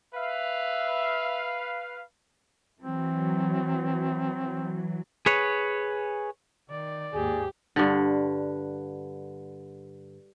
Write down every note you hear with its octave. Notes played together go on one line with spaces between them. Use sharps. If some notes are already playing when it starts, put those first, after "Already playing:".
B4 E5 F5
E3 F#3 C4
G#4 B4 C#5
D#3 D5
D#2 G#2 G4 G#4
G2 D3